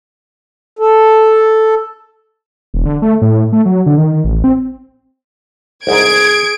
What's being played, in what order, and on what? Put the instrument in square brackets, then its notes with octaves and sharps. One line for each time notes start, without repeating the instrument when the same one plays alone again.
[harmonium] A4
[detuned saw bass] E1
D3
A3
A2
A3
F#3
D3
D#3
A1
C4
[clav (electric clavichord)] C2 G#2 [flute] G#4 [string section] G#6 [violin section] D7